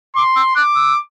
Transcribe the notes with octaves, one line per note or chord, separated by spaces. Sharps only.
C6 D6
E6
D6 F#6
E6